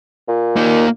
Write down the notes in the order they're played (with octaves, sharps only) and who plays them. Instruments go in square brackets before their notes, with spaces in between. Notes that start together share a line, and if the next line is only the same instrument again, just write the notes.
[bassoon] A#2
[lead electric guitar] A#3 D#4